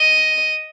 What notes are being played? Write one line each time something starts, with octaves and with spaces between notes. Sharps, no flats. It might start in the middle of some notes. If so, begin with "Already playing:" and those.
Already playing: D#5